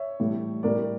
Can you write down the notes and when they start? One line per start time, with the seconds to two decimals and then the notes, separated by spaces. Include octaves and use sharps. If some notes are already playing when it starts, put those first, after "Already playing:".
Already playing: C#5 E5
0.20 A2 E3 G3
0.63 A2 G3 A#4 D5